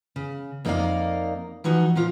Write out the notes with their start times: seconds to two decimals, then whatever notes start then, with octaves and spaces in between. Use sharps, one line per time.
0.16 C#3
0.65 F2 A#3 D#4 A#4 D5 F5
1.64 E3 F3 D#4 F#4
1.95 A#2 F3 F4